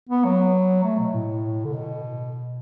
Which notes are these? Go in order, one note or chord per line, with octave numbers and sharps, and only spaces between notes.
B3
F#3
A3
B2
A2
D3
B2